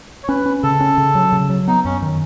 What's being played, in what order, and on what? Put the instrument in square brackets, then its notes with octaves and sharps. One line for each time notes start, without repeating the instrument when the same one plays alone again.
[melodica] C#5
[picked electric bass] C#4 [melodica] B4
[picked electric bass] C#4
[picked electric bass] C#3 [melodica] A4
[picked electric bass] C#4
C#3
F#3
C#3
F#3
[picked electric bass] B3 [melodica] D#4
[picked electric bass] F#2 [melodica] C#4
[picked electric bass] D#3